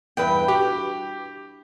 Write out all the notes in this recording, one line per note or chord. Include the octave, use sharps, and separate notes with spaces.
E2 G2 B4 G5
F#4 G4